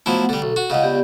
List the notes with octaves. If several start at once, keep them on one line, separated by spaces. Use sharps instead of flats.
F3 F#3 A3 B3 E4 F#5
D3 G3 A4
B1
F#4
C#2 C#3 D#5 F5 F#5
B3 G4 D5